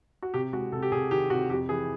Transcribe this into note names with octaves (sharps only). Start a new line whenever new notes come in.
F#4
C3 G4
G#3 F#4
C3 A4
G4
C3 G#4
D#3 G4
C3 F#4
F2 G4
E3 G#4